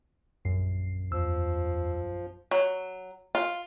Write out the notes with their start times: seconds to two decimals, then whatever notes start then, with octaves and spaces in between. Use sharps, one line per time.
0.45 A#1 F#2 C7
1.12 E2 F3 E6
2.51 F#3
3.35 F4